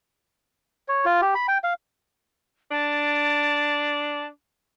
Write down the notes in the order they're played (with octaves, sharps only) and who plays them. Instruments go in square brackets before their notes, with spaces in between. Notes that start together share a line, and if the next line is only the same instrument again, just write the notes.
[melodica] C#5
F4
G4
B5
G5
F5
[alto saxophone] D4 [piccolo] A5